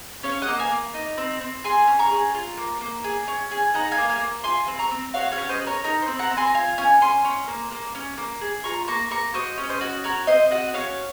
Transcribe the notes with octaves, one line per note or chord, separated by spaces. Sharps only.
C#4 C#5 F5
D#5 F#5
A#3
F5 G#5
A#3
D#4
C4
C4
G#4 G#5 C6
C#4
A#5 C#6
G#4
F4
A#3
A#3
G#4
C#4
G#4
D#4 F#5 A#5
F5 G#5
A#3
F5 G#5
A#3
F4 G#5 C6
C4
A#5 C#6
C4
F#4 C#5 F5
C#5 F5
C#4
C5 D#5
F#4
A#4 C#5
D#4 A#4
C5
C4
F#5 A#5
C4
G#5 C6
A#5
F4 F5 G#5
C#4 F5 G#5
C#4 G#5 C6
C#4
A#3
A#3
C#4
A#3
G#4
F4 A#5 C#6
A#3 A#5 C#6
A#3 A#5 C#6
F#4 C5 D#5
C#4
C5 D#5
F#4
F#4 A#4 C#5
C4 C5 D#5
F#4 D#5 F#5
C#4 C#5 F5